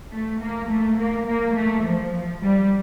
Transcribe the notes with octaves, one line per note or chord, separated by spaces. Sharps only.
A3
A#3
A3
A#3
A#3
A3
F3
G3